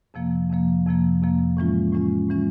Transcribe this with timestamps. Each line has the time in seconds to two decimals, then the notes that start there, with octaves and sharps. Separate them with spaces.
0.14 F2 C3 F3 A#3
0.50 F2 C3 F3 A#3
0.86 F2 C3 F3 A#3
1.21 F2 C3 F3 A#3
1.57 A2 E3 G#3 C#4 F4
1.93 A2 E3 G#3 C#4 F4
2.29 A2 E3 G#3 C#4 F4